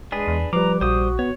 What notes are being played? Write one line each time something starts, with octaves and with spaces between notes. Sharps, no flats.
G#3 D4 G#4 B4
E2
F3 G3 B4 A#5 D6
A#1 F#4 C5 D#6
B3 C#5